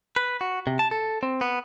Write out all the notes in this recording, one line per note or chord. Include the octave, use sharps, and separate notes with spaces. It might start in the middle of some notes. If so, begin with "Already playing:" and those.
B4
F#4
C3
A5
A4
C4
B3